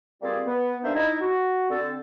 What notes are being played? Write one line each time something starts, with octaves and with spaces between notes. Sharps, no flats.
G3 A#3 C4 F4 G#4 D5
B3
G3 A#3 D4 D#4 C5 E5
D#4 E4
F#4
D3 C4 A4